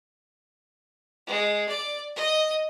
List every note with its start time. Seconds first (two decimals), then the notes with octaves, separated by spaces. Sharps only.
1.27 G#3
1.68 D5
2.16 D#5